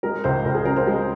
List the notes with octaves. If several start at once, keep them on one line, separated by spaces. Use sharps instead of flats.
G#3 A#4
C#2 C5
C#2 A#4
G#4
C#3 A#4
C5
G#3